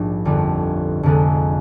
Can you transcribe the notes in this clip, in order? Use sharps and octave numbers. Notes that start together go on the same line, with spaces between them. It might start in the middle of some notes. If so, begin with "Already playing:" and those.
Already playing: A#1 G#2 G3 D4
G1 F2 D3 G3
F1 F2 D3 F3 G#3